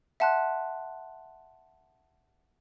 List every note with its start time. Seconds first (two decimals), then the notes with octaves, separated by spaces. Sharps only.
0.20 E5 F#5 A5 C6 F#6